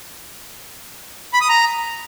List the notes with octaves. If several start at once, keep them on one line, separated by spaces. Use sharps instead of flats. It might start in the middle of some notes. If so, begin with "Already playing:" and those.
B5
D#6
A#5